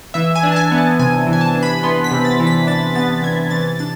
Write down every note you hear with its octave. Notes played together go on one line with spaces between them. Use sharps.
E3 E5
G#5
D4
A5
G#5
B3
A5
C3 G#5
E3
G#5
A5
D4
B5
B3 C6
B6
C3
A6
E3
B6
D4 A6
B3 A6
C3 G#6
E3 A6
D4 A6